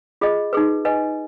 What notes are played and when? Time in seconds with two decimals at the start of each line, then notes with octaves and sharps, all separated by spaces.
0.21 F4 G#4 D#5
0.53 D#4 G#4 B4
0.85 B4 D#5 G#5